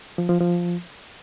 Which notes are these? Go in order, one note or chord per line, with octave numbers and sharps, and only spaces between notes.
F3
F3
F3